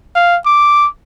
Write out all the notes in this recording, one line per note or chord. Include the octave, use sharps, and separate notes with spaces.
F5
D6